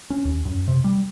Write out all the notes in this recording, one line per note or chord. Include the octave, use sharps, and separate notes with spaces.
C#4
D#2
F#2
C3
G3